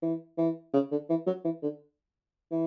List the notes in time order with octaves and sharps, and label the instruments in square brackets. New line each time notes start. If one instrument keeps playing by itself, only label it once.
[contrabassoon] E3
E3
C#3
D3
E3
F#3
E3
D3
E3